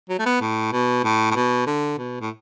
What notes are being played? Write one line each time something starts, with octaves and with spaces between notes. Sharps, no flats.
F#3
A3
B3
A2
B2
A2
A2
B2
D3
B2
A2